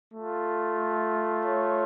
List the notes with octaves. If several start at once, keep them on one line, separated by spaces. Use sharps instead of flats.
A3 F4
C#5